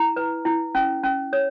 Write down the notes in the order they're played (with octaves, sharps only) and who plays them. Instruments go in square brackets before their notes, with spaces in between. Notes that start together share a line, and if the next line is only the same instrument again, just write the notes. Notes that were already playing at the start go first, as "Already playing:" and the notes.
Already playing: [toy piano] E4 A#5
B4
E4
C#4
C#4
C#5